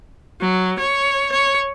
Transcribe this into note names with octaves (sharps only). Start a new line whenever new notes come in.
F#3
C#5
C#5